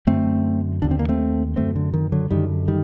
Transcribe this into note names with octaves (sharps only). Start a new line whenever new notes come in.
F#2 D3 A3 C4
D#2 D3 D4
C4
A#3
A3 C4
F#2 D3 A3 C4
D3
D#3
D3 F#3
F#2 D3 D#3 G3
D#3 G3